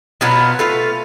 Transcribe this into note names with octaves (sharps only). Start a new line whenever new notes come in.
B2 F#3 B3 F4
A3 F4 B4 F5